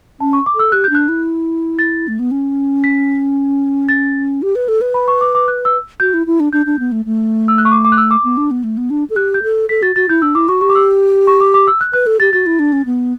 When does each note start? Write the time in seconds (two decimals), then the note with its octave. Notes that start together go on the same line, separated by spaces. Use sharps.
0.20 C#4 A5
0.33 C#6
0.46 D6
0.55 A4 E6
0.72 G4 F#6
0.84 G6
0.90 D4 F#6
1.08 E4
1.79 A6
2.08 A3
2.19 B3
2.31 C#4
2.84 B6
3.89 A6
4.42 G4
4.55 B4
4.68 A4
4.81 B4
4.94 B5
5.08 C#6
5.21 D6
5.35 D6
5.48 F#6
5.65 E6
6.00 F#4 G6
6.14 E4
6.27 E4
6.40 D4
6.53 D4 G6
6.66 D4
6.79 B3
6.92 A3
7.06 A3
7.48 E6
7.58 F#6
7.65 C#6
7.71 D6
7.85 D6
7.92 F#6
7.97 E6
8.11 D6
8.24 B3
8.37 D4
8.51 B3
8.64 A3
8.78 B3
8.90 D4
9.10 A4
9.16 G4 F#6
9.34 G6
9.43 A4
9.69 A4 B6
9.82 F#4 A6
9.96 F#4 A6
10.09 E4 G6
10.22 D4 E6
10.35 E4 D6
10.48 F#4 C#6
10.61 G4 C#6
10.69 D6
10.75 E6
11.27 C#6
11.41 D6
11.54 D6
11.67 E6
11.81 F#6
11.93 B4 F#6
12.07 A4
12.20 G4 A6
12.33 F#4 A6
12.46 E4
12.59 D4
12.73 C#4
12.86 B3